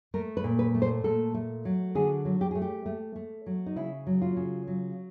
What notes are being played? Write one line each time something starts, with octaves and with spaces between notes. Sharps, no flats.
A3 A#4
B4
A#2
B4
A3
C5
A#2 A4
A3
F#3
D3 G#4
F#3
G4
A3 G#4
G4
A3
A3
F#3
D#4
C#3 E4
F#3
F4
C#3
F#3